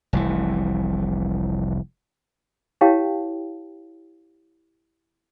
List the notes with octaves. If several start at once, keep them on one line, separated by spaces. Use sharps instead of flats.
F1 C2 E3
E4 G4 C#5 F5 G5 A5